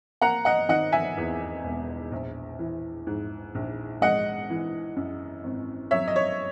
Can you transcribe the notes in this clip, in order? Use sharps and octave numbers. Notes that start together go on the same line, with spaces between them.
A#3 F#5 A#5
D#5 F#5
D#3 D#5 F#5
E5 G#5
E2
E1
A#1
E3
G#2
A#1
G#3 D#5 F#5
E3
F#2
G#1
F#3 C#5 E5
D#5
C#5